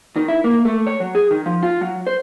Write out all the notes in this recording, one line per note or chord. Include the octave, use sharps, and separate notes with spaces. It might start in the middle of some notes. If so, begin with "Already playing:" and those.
D#3
E4
A#3
A3
C#5
F#3
G#4
D#3
F3
F4
F#3
C5